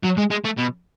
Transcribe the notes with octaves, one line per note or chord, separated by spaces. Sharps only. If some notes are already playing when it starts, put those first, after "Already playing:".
F#3
G#3
G#3
A3
B2